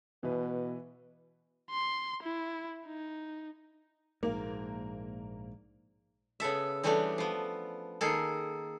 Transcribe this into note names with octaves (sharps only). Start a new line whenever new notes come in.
B2 E3 B4
C6
E4
D#4
A#1 G#2 A#3
C#3 B3 A4 E5
E3 G3 A3 B3 C#4 D4
F3 B3
D#3 A#3 G#4 A4